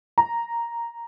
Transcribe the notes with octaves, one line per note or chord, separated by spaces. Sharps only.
A#5